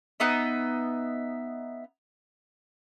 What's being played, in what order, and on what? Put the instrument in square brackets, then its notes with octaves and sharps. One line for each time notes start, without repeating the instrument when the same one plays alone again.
[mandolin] B3 D#4 D#5 E5